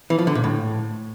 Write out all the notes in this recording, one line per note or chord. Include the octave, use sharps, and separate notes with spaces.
E3
F3
D3
A#2
A2